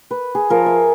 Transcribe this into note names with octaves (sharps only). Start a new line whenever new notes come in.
B4
G#4
F3 A#4 A#5
E5